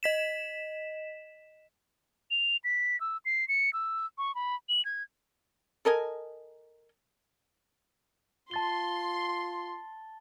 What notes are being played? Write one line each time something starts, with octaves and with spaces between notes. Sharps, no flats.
D#5 B6 E7
F7
B6
E6
C7
C#7
E6
C#6
B5
F#7
G#6
A4 A#4 D#5 G#5
F4 A5 C6 A6 G7